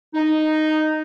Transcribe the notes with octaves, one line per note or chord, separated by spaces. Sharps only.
D#4